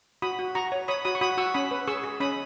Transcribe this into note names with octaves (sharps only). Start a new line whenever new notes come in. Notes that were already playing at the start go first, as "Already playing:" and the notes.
F#4 B5 D#6
F#4
F#4 A#5 C#6
C#5
C#5 B5 D#6
F#4 B5 D#6
C#6
F#4 B5 D#6
F#4 C#6 E6
C#4 B5 D#6
B4
G#4 C#6 E6
G#4
C#4 B5 D#6